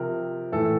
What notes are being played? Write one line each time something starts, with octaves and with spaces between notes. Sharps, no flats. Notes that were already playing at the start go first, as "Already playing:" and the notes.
Already playing: C3 F3 A#4
A2 E3 A4